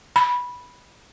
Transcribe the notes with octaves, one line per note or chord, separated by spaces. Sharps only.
B5